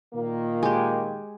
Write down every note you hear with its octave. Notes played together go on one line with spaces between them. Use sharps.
A#2 D#3 A#3
G#3 G4